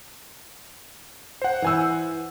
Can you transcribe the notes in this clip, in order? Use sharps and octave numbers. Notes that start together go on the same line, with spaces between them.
C5 F#5
E3 G#5 E6